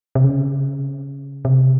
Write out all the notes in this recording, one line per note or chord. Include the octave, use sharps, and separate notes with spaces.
C3
C#3
C3